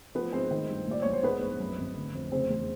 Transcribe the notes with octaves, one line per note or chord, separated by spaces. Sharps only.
F3 B3 B4
G#2 C4 C5
D#3
G2
A#2 D5
B1 C#5
C5
G#2 B3 B4
A#1
F#2
G#1
D3
F2
C#3 C4 C5
E2